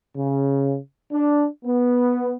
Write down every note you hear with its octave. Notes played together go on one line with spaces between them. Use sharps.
C#3
D4
B3